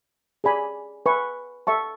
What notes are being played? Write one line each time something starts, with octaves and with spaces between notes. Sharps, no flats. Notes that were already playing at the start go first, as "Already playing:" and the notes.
G#4 D5 G#5 B5
B4 E5 G#5 C#6
A4 E5 A5 C#6